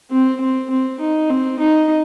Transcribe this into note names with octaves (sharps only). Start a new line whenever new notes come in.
C4
C4
C4
D#4
C4
D#4